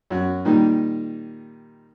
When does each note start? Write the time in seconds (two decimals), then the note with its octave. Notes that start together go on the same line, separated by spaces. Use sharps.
0.10 F#2 F#4
0.45 A#2 D#3 G3 D#4